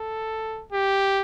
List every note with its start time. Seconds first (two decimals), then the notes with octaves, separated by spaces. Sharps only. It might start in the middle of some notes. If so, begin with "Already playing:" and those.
Already playing: A4
0.72 G4